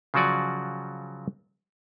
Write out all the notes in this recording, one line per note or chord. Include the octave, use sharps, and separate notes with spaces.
C#3 F3 F#3 F#4 D5 G#5